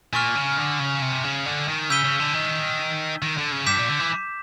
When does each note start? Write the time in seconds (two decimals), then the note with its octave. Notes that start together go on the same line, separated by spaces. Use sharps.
0.13 A#2 G#5 C#6 F6
0.35 C#3
0.57 D3
0.80 C#3
1.02 C3
1.24 C#3
1.46 D3
1.68 D#3
1.90 C#3 E6 G6 B6 D#7 G7
2.04 C#3
2.19 D3
2.34 D#3
3.22 D#3
3.38 D3
3.52 C#3
3.66 G2 D6 G6 B6 E7
3.78 A#2
3.89 D3
3.99 E3